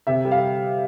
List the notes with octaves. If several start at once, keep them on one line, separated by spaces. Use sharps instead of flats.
C3 E5
G3
F5